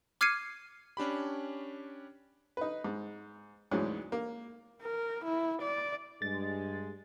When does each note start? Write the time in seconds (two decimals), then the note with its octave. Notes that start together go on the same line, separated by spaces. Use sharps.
0.21 D6 F6 G#6 C7 C#7 D#7
0.97 C#4 D4 G4 B5
2.57 D#4 B4
2.84 G#2
3.71 D2 G#2 E3 F#3 G#3 C#4
4.12 A#3
4.82 A#4
5.25 E4
5.62 D5
6.22 G2 G#3 A6